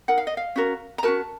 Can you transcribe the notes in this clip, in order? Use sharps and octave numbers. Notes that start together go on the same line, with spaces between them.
D#4 A#4 F#5
F5
D#5
F5
C#4 F#4 A#4
A#5
C#4 F#4 A#4 A5